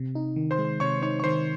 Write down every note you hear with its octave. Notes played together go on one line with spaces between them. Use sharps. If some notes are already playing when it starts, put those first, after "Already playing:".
Already playing: C3
D#4
D#3
C5 C6
G#3
C3 C#5 C#6
D#4 C#5 C#6
C#6
D#3 C5 C6